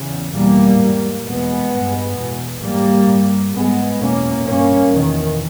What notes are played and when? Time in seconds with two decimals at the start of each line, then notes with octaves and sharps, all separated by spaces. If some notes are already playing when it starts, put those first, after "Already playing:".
Already playing: E2 C#3
0.32 E2 B2 G3 A#3
0.79 G#2
1.25 E2 B2 G#3 B3
1.71 G2
2.17 E2 B2
2.63 G#2 G3 A#3
3.09 G2
3.55 G#2 G#3 B3
4.01 E2 B2 A#3 C#4
4.47 G2 A#3 C#4
4.93 E2 B2 D#3